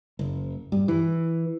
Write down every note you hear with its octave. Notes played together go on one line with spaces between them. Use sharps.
F#1
G2
E3